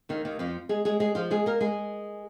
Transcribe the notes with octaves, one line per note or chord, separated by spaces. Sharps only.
D#2 D#3
D#2 D#3
F2 F3
G#3 G#4
G#3 G#4
G#3 G#4
F3 F4
G#3 G#4
A#3 A#4
G#3 G#4